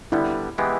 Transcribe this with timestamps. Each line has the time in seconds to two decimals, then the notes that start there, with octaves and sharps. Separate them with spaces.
0.12 D3 G3 B3 E4
0.58 E3 G#3 B3 E4 G4